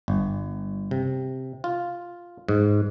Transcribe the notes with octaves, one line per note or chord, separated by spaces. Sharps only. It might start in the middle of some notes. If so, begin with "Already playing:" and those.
G1
C3
F4
G#2